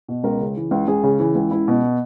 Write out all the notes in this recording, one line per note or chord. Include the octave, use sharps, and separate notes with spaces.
B2
C#2 A#4
C#3
E3
C#2
C#2 G#4
C#3
E3
C#2
C#2 E4
B2